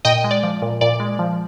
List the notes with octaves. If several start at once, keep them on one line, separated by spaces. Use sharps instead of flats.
A#2 D#5 G5
G#3
D5
F3
A#2
A#2 D5
G#3
F3